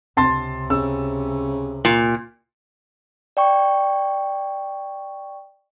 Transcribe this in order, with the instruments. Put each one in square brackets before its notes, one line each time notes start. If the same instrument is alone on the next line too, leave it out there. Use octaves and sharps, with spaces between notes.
[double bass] C#2 C3 [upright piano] A5 C6 A6
[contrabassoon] C#3 [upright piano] E6
[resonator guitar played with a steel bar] A#2
[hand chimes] D5 G5 C#6